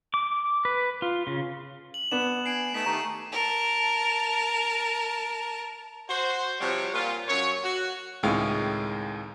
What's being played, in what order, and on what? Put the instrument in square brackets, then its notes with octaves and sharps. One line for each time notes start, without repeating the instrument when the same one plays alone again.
[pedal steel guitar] D6
B4
F4
C#3
[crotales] F#7
[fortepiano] B3 D4 [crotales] E7
[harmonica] G#5 [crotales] C7 D7
[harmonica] A3 B3 D#4 [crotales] B6 E7
[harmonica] D#3 A3 G4 [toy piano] A#5 [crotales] C#6 D#7
[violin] A#4 A5
[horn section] F#4 C5
C3 F3 G3 F#4 C#5
A#2 F4
F#2 C#5
F#4
[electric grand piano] C#2 A2 G#3 [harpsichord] D#3 C4 F5